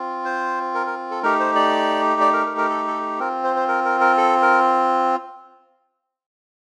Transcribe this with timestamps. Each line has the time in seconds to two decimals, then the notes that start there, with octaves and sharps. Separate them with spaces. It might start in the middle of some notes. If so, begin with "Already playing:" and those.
Already playing: C4 F4
0.25 C5
0.74 A#4
0.86 A#4
1.11 A4
1.23 A3 D#4 G4 A#4
1.40 C5
1.55 D5
2.21 D5
2.33 A#4
2.46 A#4
2.57 A#4
2.70 A4
2.87 A4
3.19 C4 F4 A#4
3.44 C5
3.56 C5
3.68 A#4
3.85 A#4
4.01 A#4
4.18 A4
4.42 A#4